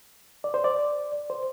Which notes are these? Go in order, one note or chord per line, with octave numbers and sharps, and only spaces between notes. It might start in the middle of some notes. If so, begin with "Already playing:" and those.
D5
C5
D5
C5